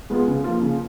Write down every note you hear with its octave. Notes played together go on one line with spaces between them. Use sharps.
G#3 B3 F4 G#4
C#3
F3 A#3 F4
C#3